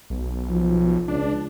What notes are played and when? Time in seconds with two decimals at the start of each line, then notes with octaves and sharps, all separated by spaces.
0.10 B1
0.50 F3
1.08 C#2 D4